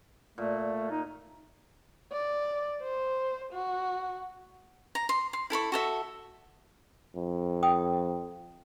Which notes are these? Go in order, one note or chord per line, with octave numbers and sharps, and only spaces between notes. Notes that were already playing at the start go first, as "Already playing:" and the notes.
A#2 A3
D#4
D5
C5
F#4
A#5
C6
C6
E4 A4 B5 C#6
F#4 A4 E5
F2
G5 D#6